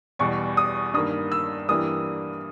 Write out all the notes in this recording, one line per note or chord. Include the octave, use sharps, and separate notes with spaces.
E2 B2 G3 C#6
D#6
G2 D#3 A#3 D#6
E6
G2 E3 G3 A#3 D#6